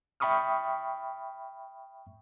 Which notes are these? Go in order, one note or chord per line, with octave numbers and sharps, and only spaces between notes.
E5 G5 B5 C#6 D#6 F6